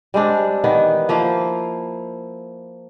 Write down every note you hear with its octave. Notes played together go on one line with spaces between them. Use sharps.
G3 G#3 C4 D4
D#3 E3 B3
F3 A#3 E4 C5